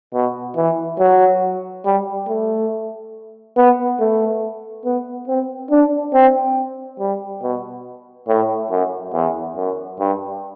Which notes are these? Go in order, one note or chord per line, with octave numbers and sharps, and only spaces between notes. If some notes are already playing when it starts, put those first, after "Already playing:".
B2
E3
F#3
G3
A3
B3
A3
B3
C4
D4
C4
G3
B2
A2
F#2
E2
F#2
G2